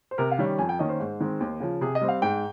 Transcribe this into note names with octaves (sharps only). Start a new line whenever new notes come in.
C5
C3 A#4
F5
D#3 G3 C#4
F2 G#5
G5
D#3 A#3 C#4 D#5
C5
G#2
D#3 G#3 C4
D#2
C#3 F3
C3 G#4
D#5
G3 C4
F5
G#2 G5